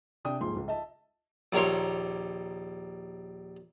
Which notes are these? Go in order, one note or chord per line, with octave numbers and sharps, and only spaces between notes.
C3 D4 G5 D#6
D#1 A#1 G#2 F3 G#4 C6
C#2
D#5 E5 A5
A#1 D#2 A#4 C#5 C6